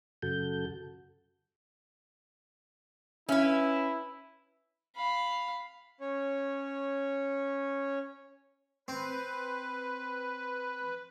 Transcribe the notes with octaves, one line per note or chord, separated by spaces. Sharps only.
F#2 C#3 F#4 A4 G6
C#4 E4 B4 E5
F5 B5
C#4 C#5
C4 B4